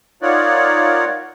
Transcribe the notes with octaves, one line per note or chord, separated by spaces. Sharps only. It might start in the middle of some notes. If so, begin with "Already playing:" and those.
D#4 F4 A#4 C#5 D5 F#5